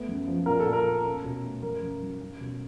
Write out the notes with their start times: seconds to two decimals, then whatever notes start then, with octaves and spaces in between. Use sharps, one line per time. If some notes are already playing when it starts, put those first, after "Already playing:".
Already playing: A3 B3
0.08 F#2
0.28 F3
0.46 A#2 A#4
0.60 A4
0.66 A#2
0.73 A#4
0.86 A#3
1.05 C#4
1.24 B2
1.43 A3
1.63 F#2 A#4
1.82 F#2
2.02 F#3
2.20 C#4
2.41 B2